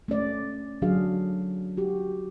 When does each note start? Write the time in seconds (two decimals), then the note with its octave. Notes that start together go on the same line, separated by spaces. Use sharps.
0.08 A3 C#4 D5
0.82 D3 F#3 D4 F#4 G#4 F5
1.77 F#4 G4